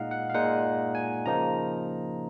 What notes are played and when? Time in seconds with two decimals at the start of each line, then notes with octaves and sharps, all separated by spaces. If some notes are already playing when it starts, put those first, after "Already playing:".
Already playing: A#2 G#3 D#4 D#5 F5 F#5
0.11 F#5
0.30 F5
0.34 A#2 G#3 D#4 F#5
0.95 G#5
1.26 C#3 F3 A#3 D#4 A#5